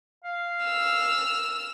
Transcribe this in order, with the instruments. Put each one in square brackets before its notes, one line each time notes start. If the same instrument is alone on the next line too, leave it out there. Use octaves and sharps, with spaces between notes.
[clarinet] F5
[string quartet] E6 F6